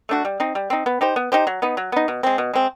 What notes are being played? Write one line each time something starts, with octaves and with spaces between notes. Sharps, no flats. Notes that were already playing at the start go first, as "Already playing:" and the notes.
A3 D4 F#4
G3
C4 D#4
G3
C4 D#4
B3
D#4 G4 C5
B3
D#4 G4 C5
F#3
B3 D#4
F#3
B3 D#4
B2
G#3 C4
B2
G#3 C4